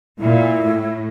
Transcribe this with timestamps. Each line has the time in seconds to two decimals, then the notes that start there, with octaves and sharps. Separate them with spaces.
0.19 A#2 E4
0.62 A2